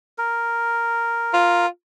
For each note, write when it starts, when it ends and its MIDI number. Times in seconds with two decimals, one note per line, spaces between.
0.18 1.66 70
1.33 1.67 65